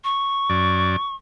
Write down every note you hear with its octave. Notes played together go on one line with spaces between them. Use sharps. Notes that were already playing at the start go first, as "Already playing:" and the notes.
C#6
F#2 D5